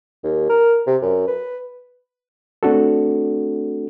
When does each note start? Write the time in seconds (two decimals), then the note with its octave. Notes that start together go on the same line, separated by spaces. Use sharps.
0.24 D#2
0.49 A#4
0.87 C3
1.02 F#2
1.28 B4
2.63 A3 C4 D4 F#4 A4